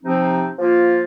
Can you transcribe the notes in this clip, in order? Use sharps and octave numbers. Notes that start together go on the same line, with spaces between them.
C3 F3 C4 D#4
F3 A#3 F4